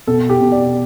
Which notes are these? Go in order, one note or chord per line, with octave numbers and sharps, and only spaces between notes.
B2 A4
G4
B2
D5